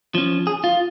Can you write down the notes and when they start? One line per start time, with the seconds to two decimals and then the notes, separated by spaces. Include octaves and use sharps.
0.15 F3 C#4
0.47 G#4
0.64 F4